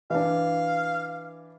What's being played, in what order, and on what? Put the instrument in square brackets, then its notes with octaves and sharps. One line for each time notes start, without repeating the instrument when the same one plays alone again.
[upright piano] E3 D4 [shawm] F5